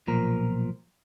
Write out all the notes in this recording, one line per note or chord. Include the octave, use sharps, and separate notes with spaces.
B1 A#2 F3 A#4